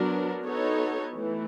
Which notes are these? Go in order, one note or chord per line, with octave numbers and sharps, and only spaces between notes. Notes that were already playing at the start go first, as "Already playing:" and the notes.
Already playing: F#3 B3 D4 F#4 A#4
B3 D#4 F#4 A4 C#5
E3 A3